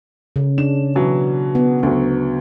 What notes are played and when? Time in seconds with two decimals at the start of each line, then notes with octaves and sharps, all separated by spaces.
0.36 C#3
0.58 D4 E7
0.95 B2 E3 F#3
1.55 B3
1.83 D2 F#3